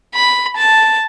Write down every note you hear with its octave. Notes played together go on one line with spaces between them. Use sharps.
B5
A5